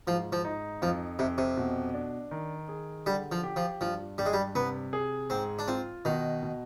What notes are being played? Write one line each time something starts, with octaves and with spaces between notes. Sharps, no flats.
G#2 F3
F3
D#4
F2 F3
F2 C3
C3
B2
D4
D#3
G#4
D3 G3
F3
G4
F3
G2 F3
G2 G3
G#3
G3
C3 B3
G#4
G#2 C4
D4
C4 F4
B2 D#3
B2